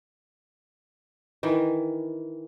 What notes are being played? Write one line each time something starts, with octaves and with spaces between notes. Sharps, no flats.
D#3 E3